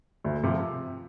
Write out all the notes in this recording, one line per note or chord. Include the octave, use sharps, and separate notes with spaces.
D2
C3 F3